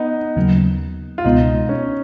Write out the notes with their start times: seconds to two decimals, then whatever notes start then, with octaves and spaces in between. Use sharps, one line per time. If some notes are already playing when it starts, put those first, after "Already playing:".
Already playing: B3 D#4
0.36 D#2 C#3 F#3 A#3
1.18 F4
1.25 C#2 B2 G#3 B3 D#4
1.69 C#4